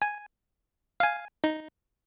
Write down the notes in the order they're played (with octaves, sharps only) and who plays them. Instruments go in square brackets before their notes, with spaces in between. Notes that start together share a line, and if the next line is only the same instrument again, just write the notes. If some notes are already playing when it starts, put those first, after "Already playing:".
[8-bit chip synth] G#5
F5 G#5
D#4